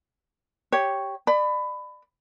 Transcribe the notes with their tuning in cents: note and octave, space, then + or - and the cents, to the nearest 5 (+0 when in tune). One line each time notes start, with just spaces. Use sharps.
G4 +0 C#5 +0
D5 +30 B5 +20